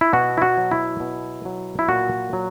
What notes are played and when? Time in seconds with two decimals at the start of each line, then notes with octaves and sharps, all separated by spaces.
0.01 E4
0.13 B2 F#4
0.37 E4
0.42 F#4
0.58 F#3
0.71 E4
1.00 B2
1.45 F#3
1.79 E4
1.88 A#2 F#4
2.33 F#3